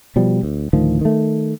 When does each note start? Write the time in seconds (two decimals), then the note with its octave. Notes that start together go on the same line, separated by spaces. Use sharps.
0.16 B2 F3 G3
0.43 D2
0.73 D2 A2 D#3 F3
1.01 D#3 A3